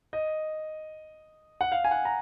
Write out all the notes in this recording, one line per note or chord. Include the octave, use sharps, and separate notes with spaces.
D#5
F#5
F5
G#5
F#5
A#5